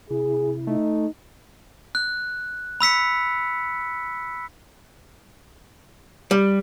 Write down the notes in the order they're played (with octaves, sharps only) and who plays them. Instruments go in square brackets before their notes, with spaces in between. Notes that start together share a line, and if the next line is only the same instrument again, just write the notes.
[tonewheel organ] C3 E4 [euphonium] G#4
[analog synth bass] A3 [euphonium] D#4
[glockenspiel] F#6
B5 E6 B6 C#7
[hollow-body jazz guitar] G3